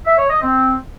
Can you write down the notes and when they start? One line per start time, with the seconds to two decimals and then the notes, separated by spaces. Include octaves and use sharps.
0.06 E5
0.17 C#5
0.29 D#5
0.41 C4